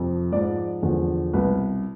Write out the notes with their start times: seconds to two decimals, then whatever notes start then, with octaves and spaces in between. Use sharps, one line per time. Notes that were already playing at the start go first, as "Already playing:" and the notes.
Already playing: F2 C3 F3
0.32 G#2 F3 D5
0.83 E2 D3 F3
1.33 C2 B2 B4